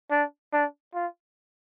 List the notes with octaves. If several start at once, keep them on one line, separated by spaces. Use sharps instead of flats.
D4
D4
F4